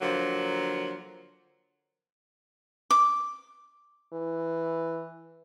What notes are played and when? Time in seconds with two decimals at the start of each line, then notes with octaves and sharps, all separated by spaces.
0.01 D3 F3 F#3 A#3
2.91 D6
4.13 E3